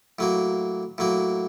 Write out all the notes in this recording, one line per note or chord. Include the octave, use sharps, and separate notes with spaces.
A2 F#3 A#3
A2 F#3 A#3